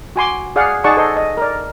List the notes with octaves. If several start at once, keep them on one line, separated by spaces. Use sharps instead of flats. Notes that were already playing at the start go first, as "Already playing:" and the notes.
F#4 G#5 C6 D6
G#4 D5 F5 F#5
D#4 G#4 D5 F#5 A5 C#6
A4 C5 D#5 C6
D#5
A#4 D5